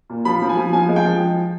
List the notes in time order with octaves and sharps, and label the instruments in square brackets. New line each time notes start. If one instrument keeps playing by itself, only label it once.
[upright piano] A#2
F3 B5
F3
G#5
F3
F3 G#5
G#3
G5
F3